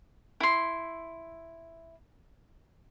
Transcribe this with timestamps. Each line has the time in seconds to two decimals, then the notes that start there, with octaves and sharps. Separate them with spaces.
0.40 E4 C6